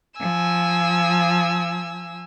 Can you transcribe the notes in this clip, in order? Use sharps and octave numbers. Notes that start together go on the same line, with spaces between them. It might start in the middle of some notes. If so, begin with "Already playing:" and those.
F3 G#5 E6